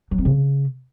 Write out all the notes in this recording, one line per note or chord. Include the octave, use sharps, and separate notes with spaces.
F#3
C4
C#3